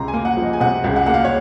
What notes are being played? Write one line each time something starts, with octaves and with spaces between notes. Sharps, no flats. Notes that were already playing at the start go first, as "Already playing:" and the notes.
Already playing: C#2 C3 A#5 C6
G#5
A#3
F#5
F3
D#5
G#5
C3 F#5
C#2
F#5
A#3 F#5
F5
C#5